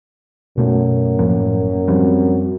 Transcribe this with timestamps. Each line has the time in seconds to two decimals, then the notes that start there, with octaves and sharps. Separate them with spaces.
0.58 F#2 B2 A3
1.19 A2 F3 A#3
1.88 F3 G3 C4